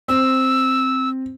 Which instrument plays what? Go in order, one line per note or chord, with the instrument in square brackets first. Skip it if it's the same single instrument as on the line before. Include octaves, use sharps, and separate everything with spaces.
[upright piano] C4 [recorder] E6